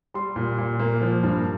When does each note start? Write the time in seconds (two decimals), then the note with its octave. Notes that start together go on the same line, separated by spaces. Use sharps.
0.14 G3 C6
0.36 A#2
0.58 A#2
0.80 A#3
1.01 F3
1.23 G2